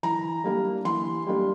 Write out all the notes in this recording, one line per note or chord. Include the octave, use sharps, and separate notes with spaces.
E3 A#5
G3 A#3 D4
E3 C6
G3 A#3 D4